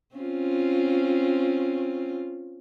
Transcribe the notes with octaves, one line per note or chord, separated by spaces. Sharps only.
C4 C#4 F4